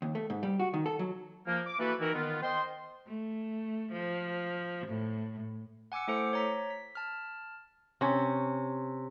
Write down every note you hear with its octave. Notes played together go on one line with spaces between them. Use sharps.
D#2
A3
G#2
G3
F#4
D#3
A4
F#3
F3 A#3
D6
E3 A#3 F#4 A4 B4
D#3 E3 D#4 E4 F#4 A#4
D#3 B3 F4
C5 D#5 G5 C6
A3
F3
A2
F#5 G#5 D6 E6 C#7
A3 E4 A4 C5 D6 C#7
C#5 A#5 B6
B6
A5 F6
C3 C#4